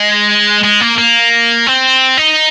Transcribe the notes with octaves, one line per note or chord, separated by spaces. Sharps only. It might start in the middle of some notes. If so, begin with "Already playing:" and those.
Already playing: G#3
G#3
A#3
A#3
C4
D#4